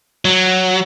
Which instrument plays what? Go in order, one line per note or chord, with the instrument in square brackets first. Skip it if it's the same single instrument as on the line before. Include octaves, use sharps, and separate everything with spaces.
[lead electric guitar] F#3